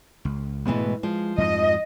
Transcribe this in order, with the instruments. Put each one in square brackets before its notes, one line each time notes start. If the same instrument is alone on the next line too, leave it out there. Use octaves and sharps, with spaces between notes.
[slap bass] C#2
[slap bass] G#2 A3 B3 [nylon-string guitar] B2 E3 G#3
[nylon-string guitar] F3 [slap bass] G#3
[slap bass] F2 G#2 [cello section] D#5